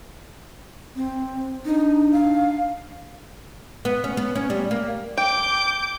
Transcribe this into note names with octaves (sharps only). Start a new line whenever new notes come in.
C4
D4 D#4
F5
B3
C#4
B3
C#4
G3
A#3
G5 D6 G6